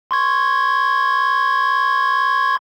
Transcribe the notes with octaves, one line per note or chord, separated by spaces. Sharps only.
C6 C#6 G#6